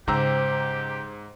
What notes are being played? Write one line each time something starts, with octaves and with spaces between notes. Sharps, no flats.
G#2 C#3 G4 C5 G5 A#5 E6